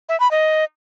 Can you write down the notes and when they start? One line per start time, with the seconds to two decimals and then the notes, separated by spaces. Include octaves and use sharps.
0.09 E5
0.20 B5
0.31 D#5